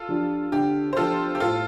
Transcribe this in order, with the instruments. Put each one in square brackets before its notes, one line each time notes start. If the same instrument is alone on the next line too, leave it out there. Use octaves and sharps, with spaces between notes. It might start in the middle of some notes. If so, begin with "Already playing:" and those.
Already playing: [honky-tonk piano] F4 A4
[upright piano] F3 D4 G4
[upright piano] D3 [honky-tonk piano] G4
[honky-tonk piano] C5
[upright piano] F3 D4 G4 [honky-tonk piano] F4 A4
[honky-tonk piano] G4
[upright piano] A2 [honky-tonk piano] F4 A4